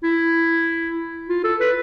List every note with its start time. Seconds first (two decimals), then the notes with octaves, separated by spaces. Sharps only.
0.04 E4
1.29 F4
1.44 A4
1.60 B4